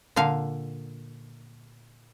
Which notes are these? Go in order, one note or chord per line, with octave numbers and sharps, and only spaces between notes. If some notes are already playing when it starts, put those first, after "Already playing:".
A#2 D3 F5